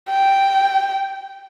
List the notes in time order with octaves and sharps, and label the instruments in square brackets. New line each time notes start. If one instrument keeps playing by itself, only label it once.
[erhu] G5